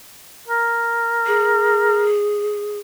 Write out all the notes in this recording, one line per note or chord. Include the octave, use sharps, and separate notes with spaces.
A#4
G#4